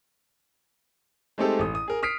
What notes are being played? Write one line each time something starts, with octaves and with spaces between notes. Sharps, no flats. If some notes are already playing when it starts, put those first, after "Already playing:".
G#3 A3 C4 D#4 G4 A4
A1 D#6
D#6
G#4 A#4
D#6 F6 B6 C7 D7